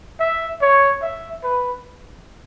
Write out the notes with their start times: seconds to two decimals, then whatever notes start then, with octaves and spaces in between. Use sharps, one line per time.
0.20 E5
0.62 C#5
1.02 E5
1.43 B4